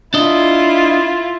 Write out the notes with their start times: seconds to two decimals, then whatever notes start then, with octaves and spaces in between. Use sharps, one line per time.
0.14 D4 E4 F4 D#5